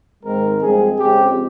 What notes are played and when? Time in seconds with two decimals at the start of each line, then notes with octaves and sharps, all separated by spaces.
0.24 G#2 D#3 G#3 C4 A#4
0.61 G2 F3 G#3 C4 G#4
0.99 F2 C#3 G#3 C4 G4